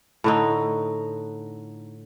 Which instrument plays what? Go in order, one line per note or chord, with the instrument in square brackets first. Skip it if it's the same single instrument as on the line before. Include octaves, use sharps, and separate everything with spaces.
[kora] A2 D3 D#4